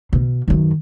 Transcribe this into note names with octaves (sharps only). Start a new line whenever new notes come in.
B2
F#2 D#3